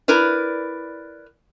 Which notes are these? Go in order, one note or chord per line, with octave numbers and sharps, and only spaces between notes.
E4 A#4 B4 D5